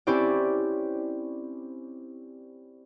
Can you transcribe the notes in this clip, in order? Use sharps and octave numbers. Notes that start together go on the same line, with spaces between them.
C4 C#4 E4 G4 C5 D5